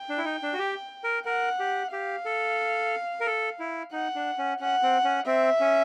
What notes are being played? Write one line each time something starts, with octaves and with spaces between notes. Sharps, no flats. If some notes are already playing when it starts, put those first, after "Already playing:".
Already playing: G5
D4
E4
D#4
D4
F#4
G4
A#4
A#4 F#5
G4
G4 F5
A4
A#4
A4
E4
D#4 F#5
D4
C#4
C#4 F#5
C4
C#4
C4 E5
C#4